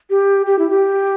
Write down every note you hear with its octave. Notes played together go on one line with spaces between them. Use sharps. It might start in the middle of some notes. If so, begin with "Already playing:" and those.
G4
G4
E4
G4